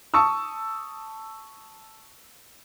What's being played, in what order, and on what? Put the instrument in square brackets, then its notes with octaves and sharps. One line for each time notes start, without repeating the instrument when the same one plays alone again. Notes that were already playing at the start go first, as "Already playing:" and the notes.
[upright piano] A5 C#6 D#6 E6